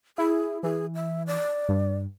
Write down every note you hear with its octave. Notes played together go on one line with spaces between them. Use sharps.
E4 G#4
E3 G#4
E5
D5
G2